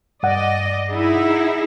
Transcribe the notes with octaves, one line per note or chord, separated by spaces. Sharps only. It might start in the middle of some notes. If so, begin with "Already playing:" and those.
G2 D5 D#5 F#5
D#4 E4 G#4